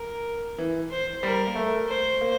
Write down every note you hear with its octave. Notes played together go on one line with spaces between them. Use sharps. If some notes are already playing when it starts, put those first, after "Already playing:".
Already playing: A#4
E3
C5
G3 A#4
A#3
A3
C5
A#3